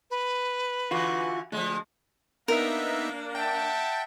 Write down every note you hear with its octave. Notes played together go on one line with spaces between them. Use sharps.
B4
D3 E3 F4 F#4
D2 F3 G#3
A#3 B3 D4 D#4 A#4 E5
E5 F#5 G5 A5